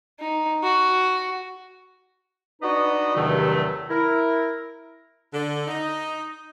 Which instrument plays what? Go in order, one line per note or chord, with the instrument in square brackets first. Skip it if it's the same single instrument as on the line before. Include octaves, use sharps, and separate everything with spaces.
[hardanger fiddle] D#4
F#4
[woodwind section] B3 D4 D#4 F#4 B4 D#5
E2 G2 C3 D#3 F#3 A3
E4 A#4
[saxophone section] D3
D#4